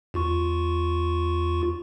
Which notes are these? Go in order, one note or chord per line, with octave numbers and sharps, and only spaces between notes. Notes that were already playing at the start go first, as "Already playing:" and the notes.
E2 F4 C#6